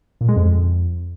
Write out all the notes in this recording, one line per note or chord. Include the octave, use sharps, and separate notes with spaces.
A#2
G#3
F2